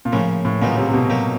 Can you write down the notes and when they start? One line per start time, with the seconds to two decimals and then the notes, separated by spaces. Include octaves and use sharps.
0.05 A#2
0.12 A2 C#3 F3 A#3
0.45 A2
0.61 D#2 A#2 C#3 F#3 B3 D#4
0.77 C3
0.89 C3
0.94 B2
1.10 F#3 A#3 D#4 G4